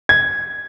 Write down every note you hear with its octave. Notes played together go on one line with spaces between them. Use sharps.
G#6